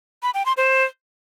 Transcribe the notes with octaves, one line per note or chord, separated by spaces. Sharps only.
B5
G5
C6
C5